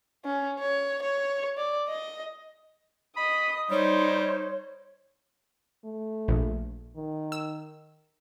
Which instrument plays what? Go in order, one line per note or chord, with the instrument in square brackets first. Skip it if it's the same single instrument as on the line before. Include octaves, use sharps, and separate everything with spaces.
[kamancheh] C#4
C#5
C#5
D5
D#5
[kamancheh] D#5 D#6 [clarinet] B5
[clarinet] G3 [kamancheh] D#4 C5 [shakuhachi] C#5
[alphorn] A3
[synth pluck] A#1
[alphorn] D#3
[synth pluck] E6